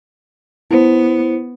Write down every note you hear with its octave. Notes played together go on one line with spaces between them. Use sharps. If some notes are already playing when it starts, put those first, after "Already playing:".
B3 E4 C5